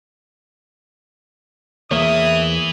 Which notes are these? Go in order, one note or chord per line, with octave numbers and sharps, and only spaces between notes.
E2 E3 A#3 C#5 E5 D#6